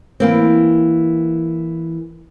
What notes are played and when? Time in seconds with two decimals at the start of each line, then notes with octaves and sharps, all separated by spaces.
0.20 E3 A#3 C4